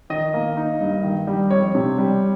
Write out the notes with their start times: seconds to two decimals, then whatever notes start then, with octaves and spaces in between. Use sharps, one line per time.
0.10 D#3 D#5
0.34 A#3
0.57 D#4
0.81 G2
1.04 D#3
1.27 G3
1.51 F2 C#5
1.75 C3
1.98 G3